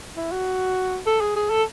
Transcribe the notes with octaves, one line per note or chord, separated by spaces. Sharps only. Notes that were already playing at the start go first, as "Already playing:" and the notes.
E4
F#4
A4
G#4
G#4
A4